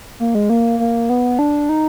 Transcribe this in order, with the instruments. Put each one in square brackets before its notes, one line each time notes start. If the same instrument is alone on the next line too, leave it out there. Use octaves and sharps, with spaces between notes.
[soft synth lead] A#3
G#3
A#3
A#3
B3
D4
D#4